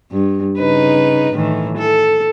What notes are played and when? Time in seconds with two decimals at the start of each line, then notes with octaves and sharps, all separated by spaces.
0.12 G2
0.58 C#3 D#4 B4
1.35 A2 D#3 E3
1.77 A4